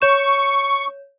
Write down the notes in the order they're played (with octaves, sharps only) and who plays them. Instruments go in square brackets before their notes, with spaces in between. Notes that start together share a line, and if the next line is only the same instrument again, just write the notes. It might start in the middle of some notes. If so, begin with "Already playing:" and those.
[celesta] C#5 G6 E7 [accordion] C#6